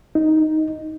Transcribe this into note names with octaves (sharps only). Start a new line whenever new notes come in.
D#4